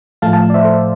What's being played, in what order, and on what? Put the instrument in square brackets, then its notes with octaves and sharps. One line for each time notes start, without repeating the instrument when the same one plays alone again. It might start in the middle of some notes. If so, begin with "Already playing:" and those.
[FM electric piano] A2 F3 A3 F5 A5
F5 A5
D5
C5 E5
A4 C5